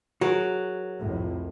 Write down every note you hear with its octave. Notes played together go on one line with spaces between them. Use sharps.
F#3 F#4 G#4 A#4
C2 F2 A2